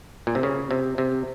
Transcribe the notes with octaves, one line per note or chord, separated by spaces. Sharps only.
A#2
C3
C#3
C3
C3